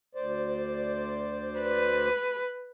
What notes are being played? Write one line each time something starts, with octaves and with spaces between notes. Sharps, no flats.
D2 C5 D5
B4